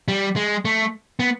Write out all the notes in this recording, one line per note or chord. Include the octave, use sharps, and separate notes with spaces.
G3
G#3
A3
B3